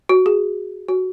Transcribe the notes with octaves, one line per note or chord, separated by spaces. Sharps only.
F#4
G#4
F#4